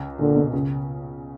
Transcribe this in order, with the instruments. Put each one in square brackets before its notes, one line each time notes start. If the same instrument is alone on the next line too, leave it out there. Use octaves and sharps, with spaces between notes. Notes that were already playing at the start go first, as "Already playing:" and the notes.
Already playing: [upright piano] C#2 C#3
[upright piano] A#2 [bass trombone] D3
[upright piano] B2
C#2 C#3